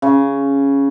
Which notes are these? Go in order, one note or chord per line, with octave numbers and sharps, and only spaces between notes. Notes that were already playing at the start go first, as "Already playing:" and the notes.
C#3